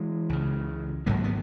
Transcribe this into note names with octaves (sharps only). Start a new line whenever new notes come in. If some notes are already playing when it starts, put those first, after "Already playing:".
Already playing: E3 G#3
C#2 C#3
G#1 G#2 F#3 A#3
B3